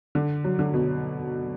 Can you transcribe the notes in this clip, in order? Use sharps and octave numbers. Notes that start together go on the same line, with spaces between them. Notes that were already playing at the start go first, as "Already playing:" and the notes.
D3
F#3
D3
B2